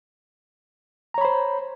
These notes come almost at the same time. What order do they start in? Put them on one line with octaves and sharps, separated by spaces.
A#5 C#5 B5 C5